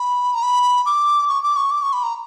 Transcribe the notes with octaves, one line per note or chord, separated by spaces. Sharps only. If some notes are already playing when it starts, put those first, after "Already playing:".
Already playing: B5
A#5
B5
D6
C#6
D6
C#6
D6
C#6
B5
A#5